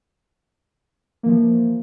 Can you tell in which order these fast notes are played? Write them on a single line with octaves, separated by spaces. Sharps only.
A#3 E3 F3